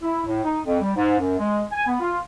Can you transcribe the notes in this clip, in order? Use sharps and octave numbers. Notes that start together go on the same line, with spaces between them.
E4
A2
D#4
F2
G3
G#2
F#2
G#3
G#5
B3
F4